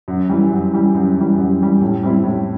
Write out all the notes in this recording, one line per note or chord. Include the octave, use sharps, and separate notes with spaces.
F#2
E3 G3
F#2
E3 G3
F#2
E3 G3
F#2
E3 G3
A2
G3 C4 E4
A2